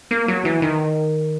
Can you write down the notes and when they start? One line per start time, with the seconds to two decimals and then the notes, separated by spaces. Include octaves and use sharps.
0.11 A#3
0.28 F#3
0.45 E3
0.62 D#3